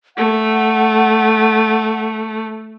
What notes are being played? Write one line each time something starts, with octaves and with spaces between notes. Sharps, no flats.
A3 F#5